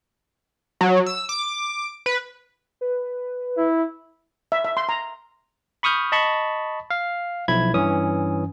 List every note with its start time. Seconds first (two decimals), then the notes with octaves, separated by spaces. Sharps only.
0.81 F#3
1.06 E6
1.29 D6
2.06 B4
2.81 B4
3.57 E4
4.52 E5
4.65 E5
4.77 C6
4.89 A#5
5.83 B5 C#6 D#6 F6 G6
6.12 D#5 A5 B5 C#6
6.90 F5
7.48 B1 F3 E4 B5 G#6
7.74 G2 E3 C#4 D#6